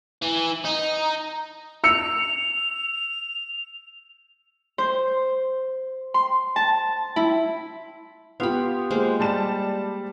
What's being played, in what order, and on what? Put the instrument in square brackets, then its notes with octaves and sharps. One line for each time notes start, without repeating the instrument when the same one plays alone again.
[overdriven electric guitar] E3
D#4
[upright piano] E6 C#7 [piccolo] F7
[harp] C5
C6
A5
E4
[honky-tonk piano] B3 F4 G4 [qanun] F5 B5
[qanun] G#3 A#3 C5
[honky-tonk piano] G3 A5 E7